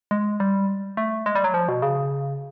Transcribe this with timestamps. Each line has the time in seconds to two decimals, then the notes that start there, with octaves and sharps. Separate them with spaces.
0.11 G#3
0.40 G3
0.97 A3
1.26 G#3
1.35 G3
1.44 F#3
1.54 F3
1.69 B2
1.82 C#3